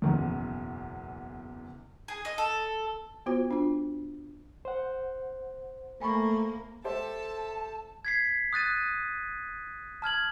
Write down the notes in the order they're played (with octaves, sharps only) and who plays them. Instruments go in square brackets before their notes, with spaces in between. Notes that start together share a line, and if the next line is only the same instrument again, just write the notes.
[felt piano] F#1 B1 E2
[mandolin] G#4
D#5
A4
[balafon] B3 F4 F#4 C5
D4 F4
[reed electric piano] C5 F#5
[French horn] A3 [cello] A#3 [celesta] G#5 B5 C#6
[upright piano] G4 C5 E5 [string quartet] A4 [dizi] A5
[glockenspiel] G#6 B6 C7
D#6 F#6 A6 D#7
A5 F6 G#6 F#7